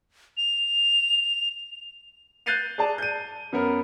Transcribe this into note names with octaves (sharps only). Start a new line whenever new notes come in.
F7
F#6 G6 A6 C7 D#7 F7
G#4 D5 A5
G6 D#7
F#2 B3 A#4